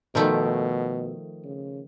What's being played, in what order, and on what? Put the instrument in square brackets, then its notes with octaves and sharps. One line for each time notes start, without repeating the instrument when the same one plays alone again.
[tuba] B2 [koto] D#3 F3 A3
[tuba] C#3